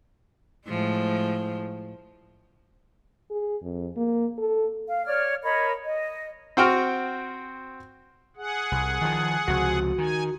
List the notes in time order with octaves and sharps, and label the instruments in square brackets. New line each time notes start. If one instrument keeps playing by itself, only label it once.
[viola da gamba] A2 F3 G#3
[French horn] G#4
F2
A#3
A4
[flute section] F5
C#5 D5 F6
A#4 C#5 D#5 B5
D#5
[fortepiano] C4 F#4 G5 F6
[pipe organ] G#4 F#5
[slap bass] C2
D#3 F3
[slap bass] C#2 C3 F3 [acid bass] F#4
[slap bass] D#3 [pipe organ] G#5